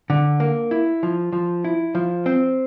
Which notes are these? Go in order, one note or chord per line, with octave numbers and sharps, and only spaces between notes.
D3
A#3
E4
F3
F3
E4
F3
C4